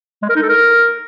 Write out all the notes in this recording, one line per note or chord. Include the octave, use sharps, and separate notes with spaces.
G#3
A#4
D#4
A4
A#4